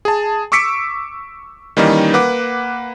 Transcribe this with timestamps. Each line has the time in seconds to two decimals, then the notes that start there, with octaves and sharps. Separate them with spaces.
0.05 G#4 A5
0.52 C#6 D6 E6 B6 C#7 D7
1.77 D#3 E3 G3 A#3 C#4 D#4
2.14 A#3 B4 F#5 D6